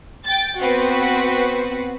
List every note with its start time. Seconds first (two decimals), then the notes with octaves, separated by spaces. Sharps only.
0.25 G5 A6
0.59 B3 C4 F#4 B4